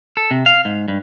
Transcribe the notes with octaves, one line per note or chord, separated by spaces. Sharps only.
A4
C3
F5
G#2
G2